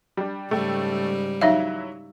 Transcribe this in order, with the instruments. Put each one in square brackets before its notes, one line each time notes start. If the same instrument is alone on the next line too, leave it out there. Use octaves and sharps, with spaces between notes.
[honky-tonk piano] G3 D4
[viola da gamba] G#2 C#3 G3 [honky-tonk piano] A3 G5
[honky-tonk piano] E3 F#3 E4 [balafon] D#4 E5 F5